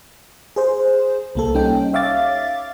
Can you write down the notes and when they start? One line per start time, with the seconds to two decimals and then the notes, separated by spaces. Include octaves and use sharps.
0.56 G#4 C5
1.35 C2 A#3 A4
1.54 G3 C#4 D#4 G5
1.93 C#5 E5 F5 D6 A6